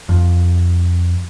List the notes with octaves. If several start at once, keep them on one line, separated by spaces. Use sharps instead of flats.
F2